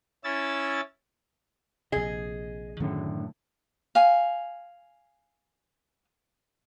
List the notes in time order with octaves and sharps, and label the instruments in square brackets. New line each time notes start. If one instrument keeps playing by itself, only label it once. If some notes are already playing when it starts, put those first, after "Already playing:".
[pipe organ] C#4 E4 E6 A6
[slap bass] A#1 C3 [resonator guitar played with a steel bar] G#4 [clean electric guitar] D#5
[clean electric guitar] F#2 A2 D3 [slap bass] D#3 A3 C#4
[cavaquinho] F5 G#5